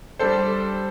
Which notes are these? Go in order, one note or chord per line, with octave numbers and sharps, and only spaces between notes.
G3 D4 A4 C5